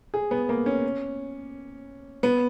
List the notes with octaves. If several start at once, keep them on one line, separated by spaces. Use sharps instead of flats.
G#4
B3
A#3
C#4
B3